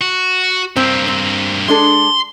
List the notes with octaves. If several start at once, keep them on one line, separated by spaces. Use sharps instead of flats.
F#4
G2 A#3 C4
C4
G#3 D4 A4 C6